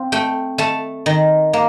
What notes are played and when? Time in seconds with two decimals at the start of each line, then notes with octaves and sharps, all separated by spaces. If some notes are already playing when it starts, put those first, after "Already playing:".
Already playing: C4 F5
0.12 A3 G5
0.58 A3 A5
1.06 D#3
1.53 A#3